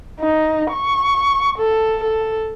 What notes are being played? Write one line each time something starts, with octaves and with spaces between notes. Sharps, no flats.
D#4
C#6
A4
A4